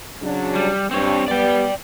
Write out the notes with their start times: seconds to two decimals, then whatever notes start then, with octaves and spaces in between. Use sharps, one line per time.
0.22 C#3 F#3 D4
0.55 G3
0.91 G2 C4 C#5
1.28 G3 B3 D5 G5